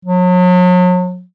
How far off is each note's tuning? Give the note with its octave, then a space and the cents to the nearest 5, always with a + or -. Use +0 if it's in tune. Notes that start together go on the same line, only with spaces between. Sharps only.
F#3 -40